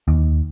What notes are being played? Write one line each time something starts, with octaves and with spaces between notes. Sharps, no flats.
D#2